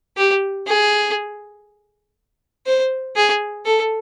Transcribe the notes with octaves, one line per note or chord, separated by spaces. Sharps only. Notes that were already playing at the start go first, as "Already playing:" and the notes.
G4
G#4
C5
G#4
A4